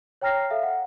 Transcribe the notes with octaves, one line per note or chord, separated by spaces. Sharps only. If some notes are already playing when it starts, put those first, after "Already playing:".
C#5 G5 A#5 F6 A#6 C7
A4 E5 F5
F#5